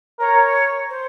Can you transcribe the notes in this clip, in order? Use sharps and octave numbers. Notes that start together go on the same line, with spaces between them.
A#4 C#5
C5